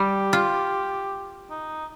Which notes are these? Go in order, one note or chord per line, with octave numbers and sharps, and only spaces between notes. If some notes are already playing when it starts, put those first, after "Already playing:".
Already playing: G3 G4
F4
D#4